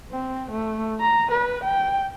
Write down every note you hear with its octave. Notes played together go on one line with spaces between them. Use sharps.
C4
A3
A#5
B4
G5